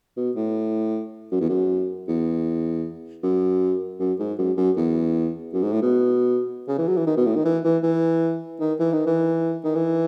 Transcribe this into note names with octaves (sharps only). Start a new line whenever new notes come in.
B2
A2
F#2
E2
F#2
E2
F#2
F#2
G#2
F#2
F#2
E2
F#2
G#2
A2
B2
C#3
E3
F#3
E3
D#3
B2
A2
D#3
E3
E3
E3
D#3
E3
D#3
E3
D#3
E3